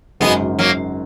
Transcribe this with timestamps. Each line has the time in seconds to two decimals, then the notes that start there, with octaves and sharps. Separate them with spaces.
0.20 G#1 F#2 C#3 G#3 B3
0.59 F#3 A#3